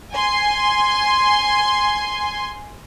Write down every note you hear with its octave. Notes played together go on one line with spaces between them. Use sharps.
G#5 C6